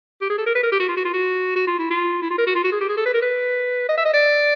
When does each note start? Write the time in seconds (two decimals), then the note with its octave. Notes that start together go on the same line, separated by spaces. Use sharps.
0.22 G4
0.30 G#4
0.38 A4
0.47 A#4
0.55 B4
0.63 A#4
0.72 G4
0.80 F#4
0.88 F4
0.97 F#4
1.05 F4
1.13 F#4
1.56 F#4
1.67 F4
1.79 E4
1.91 F4
2.22 E4
2.31 F4
2.38 A#4
2.47 F#4
2.55 F4
2.64 F#4
2.72 G#4
2.81 G4
2.89 G#4
2.97 A4
3.06 B4
3.14 A#4
3.22 B4
3.89 D#5
3.98 E5
4.05 D#5
4.14 D5